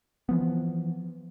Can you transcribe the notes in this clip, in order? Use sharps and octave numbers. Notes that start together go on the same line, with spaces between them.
E3 F3 B3